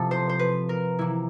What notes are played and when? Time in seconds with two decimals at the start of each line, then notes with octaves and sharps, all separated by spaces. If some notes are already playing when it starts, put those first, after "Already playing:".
Already playing: C3 F3 A4
0.11 C5
0.29 C5
0.39 B4
0.69 A#4
0.99 C3 E3 E4